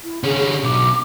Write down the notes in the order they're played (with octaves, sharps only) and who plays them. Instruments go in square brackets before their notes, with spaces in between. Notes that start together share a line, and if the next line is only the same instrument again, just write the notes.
[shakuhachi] E4
[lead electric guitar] D3 C#4 [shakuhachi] G#4
[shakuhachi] G4
[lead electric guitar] B1 [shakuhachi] D6